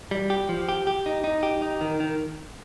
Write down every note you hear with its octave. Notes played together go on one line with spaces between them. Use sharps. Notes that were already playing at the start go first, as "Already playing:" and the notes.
G3
G4
F3
G4
G4
D#4
D#4
G4
D#4
D#3
D#3